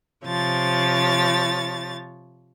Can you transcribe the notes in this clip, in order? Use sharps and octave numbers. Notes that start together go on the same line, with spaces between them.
C3 F3 C#5 A6